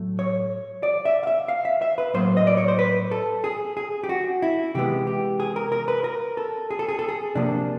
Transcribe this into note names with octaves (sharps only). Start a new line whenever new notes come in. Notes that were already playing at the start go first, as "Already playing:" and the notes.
Already playing: A2 F#3 A3
C#5
D5
E5
F5
E5
F5
E5
E5
B4
A2 F#3 A#3 C5
D#5
D5
C#5
C5
B4
A4
G#4
G#4
G4
F#4
E4
C3 E3 G#3 B3 G4
G4
G#4
A#4
A#4
B4
A#4
A4
G#4
A4
G#4
A4
G#4
C3 F3 A#3 D4